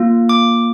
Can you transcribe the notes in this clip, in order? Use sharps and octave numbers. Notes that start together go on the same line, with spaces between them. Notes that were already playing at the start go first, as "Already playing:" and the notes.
Already playing: A#3 F4
D6